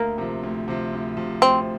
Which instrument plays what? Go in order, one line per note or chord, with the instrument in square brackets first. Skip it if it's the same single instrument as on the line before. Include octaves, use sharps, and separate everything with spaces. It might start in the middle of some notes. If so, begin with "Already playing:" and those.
Already playing: [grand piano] D2 [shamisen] A#3
[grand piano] C3 F3
D2
C3 F3
D2
C3 F3
[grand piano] D2 [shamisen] C4